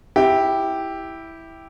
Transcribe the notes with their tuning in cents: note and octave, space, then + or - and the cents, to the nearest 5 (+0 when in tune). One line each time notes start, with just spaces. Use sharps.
E4 -5 G4 +0